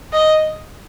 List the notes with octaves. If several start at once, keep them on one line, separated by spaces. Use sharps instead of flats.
D#5